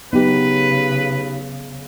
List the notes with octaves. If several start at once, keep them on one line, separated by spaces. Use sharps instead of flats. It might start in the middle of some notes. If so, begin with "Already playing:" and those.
C#3 F#3 B3 D#4 G4 B4